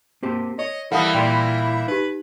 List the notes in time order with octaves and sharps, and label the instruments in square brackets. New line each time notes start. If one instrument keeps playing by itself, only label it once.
[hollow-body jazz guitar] A#3 C4 G4
[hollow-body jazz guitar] C#5 [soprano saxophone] D#5
[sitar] E3 G3 A#3 [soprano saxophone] E4 [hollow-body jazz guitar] A4 F5 [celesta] F#5 D#6
[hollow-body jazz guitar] A#2 D5 C6 [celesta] G5
[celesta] D#4 G4 [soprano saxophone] B4